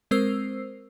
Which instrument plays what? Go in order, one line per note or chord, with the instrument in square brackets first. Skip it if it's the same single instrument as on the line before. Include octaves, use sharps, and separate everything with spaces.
[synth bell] G#3 C4 A#4 C5 E6 C7